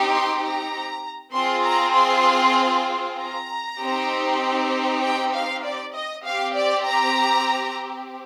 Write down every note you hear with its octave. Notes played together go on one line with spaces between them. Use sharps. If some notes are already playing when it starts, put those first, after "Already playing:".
Already playing: C4 D#4 G4
C6
A#5
C4 F4 G#4 C6
A#5
C6
A#5
C4 D#4 G4
G5
F5
D5
D#5
C4 G4 F5
D5
A#5